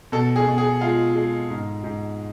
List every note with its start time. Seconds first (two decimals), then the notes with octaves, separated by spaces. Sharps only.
0.12 B2 A4
0.36 G#4
0.47 B2
0.58 G#4
0.81 G#3 F4
1.15 G#3
1.51 G#2
1.84 G#2